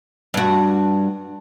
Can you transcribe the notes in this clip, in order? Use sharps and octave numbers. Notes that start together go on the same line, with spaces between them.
G2 F#4